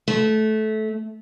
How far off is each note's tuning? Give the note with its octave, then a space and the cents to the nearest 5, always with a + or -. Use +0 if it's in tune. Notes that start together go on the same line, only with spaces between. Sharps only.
A3 -20